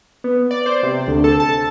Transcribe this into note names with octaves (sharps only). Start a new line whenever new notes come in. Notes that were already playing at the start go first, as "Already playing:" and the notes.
B3
D5
C5
C3
D2
A4
A5